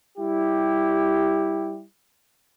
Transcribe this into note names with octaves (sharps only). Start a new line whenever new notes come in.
G3 E4 G4